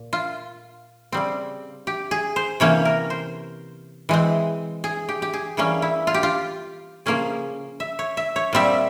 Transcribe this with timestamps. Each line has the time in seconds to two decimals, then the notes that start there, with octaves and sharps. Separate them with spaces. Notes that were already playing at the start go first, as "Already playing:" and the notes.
Already playing: A#2
0.13 F4
1.12 C#3 G3 C4
1.87 G4
2.11 G#4
2.36 C5
2.60 C3 E3 A#3 C#4 C#5
2.85 A#4
3.10 C5
4.09 E3 G#3 C4
4.84 G#4
5.09 G4
5.22 G4
5.33 G#4
5.57 E3 G3 A#3 C#4 G#4
5.82 E4
6.07 F4
6.14 G4
6.23 F4
7.06 C#3 F3 A#3 C#4 G#4
7.80 E5
7.99 C#5
8.17 E5
8.36 C#5
8.53 A#2 G3 C4 E5